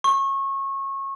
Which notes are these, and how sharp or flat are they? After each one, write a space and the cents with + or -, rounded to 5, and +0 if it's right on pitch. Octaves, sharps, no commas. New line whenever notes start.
C#6 -25